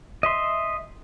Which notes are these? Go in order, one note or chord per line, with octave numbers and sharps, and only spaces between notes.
D#5 E5 C6